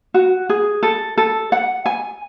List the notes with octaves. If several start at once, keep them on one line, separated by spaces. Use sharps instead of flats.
F#4
G#4
A4
A4
F#5
G#5